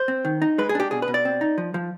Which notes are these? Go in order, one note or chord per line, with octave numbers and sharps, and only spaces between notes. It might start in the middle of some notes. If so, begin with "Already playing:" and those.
Already playing: C5
C4
D#3
D#4
G#3 B4
G#4
D4 G4
B2 G#4
B4
B2
D5
C4
D#4
F3
F3